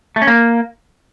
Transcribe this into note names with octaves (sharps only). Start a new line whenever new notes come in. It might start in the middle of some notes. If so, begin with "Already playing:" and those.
A3
C#4
A#3